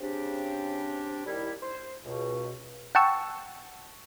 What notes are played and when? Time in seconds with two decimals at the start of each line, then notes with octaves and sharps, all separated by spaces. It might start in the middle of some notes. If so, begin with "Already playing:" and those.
0.01 C#3 C4 D4 G4
1.26 D#2 G3 E4 G4
1.62 C5
2.05 C#2 B2
2.95 F#5 G5 A5 C#6 E6